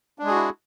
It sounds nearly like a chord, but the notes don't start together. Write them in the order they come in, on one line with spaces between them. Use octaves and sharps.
D4 G#3 G#4 F#4 E4